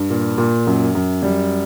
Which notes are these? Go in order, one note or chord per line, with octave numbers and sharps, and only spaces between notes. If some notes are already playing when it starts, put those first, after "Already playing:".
Already playing: G2
A#2
A#2
F#2
F#2
G3